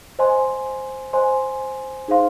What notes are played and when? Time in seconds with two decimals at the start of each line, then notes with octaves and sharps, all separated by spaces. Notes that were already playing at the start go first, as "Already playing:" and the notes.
0.19 C5 D#5 G#5 C6
1.13 C5 D#5 G#5 C6
2.08 D#4 G#4 C5 F5 C6